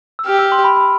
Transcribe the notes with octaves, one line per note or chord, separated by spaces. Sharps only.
E6
G4 F6
E6
C6
B5
B5